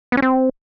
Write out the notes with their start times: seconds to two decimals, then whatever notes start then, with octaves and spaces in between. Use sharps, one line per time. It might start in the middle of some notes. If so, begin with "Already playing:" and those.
0.12 B3
0.17 C#4
0.22 C4